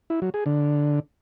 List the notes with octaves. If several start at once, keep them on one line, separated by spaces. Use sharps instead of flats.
E4
F#3
G#4
D3